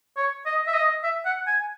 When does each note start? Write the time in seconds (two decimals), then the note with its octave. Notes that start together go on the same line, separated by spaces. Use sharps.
0.16 C#5
0.46 D#5
0.67 E5
0.74 D#5
1.03 E5
1.25 F#5
1.47 G#5